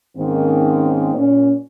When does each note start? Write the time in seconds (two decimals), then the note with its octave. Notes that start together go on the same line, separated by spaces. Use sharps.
0.17 G#2 D#3 A#3 C4 C#4
1.13 A#2 C#4